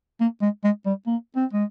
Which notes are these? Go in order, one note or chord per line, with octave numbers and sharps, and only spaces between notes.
A#3
G#3
G#3
G3
A#3
C4
G#3